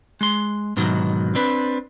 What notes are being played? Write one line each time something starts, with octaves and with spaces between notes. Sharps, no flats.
G#3 C6
G#2 B2 D#3 F#3
C4 D4 B4